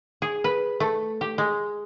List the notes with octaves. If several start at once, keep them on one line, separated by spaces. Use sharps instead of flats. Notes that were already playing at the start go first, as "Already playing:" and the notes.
G#4
B4
A3
G4
G#3